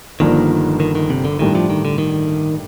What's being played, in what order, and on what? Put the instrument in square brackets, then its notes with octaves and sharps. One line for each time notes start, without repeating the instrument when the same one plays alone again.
[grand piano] G1 G2 F3 A#3 [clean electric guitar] D#3
[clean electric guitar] D#3
D#3
C3
D3
[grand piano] A2 G3 D4 [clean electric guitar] D#3
[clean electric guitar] F3
D#3
D3
D#3